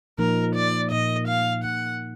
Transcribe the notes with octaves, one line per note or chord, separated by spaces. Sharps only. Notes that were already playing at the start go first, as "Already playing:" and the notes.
A#2 F3 A#3 D#4 A#4
D5
A#2 F3 A#3 D#4 D#5
F5
A#2 F3 A#3 D#4 F#5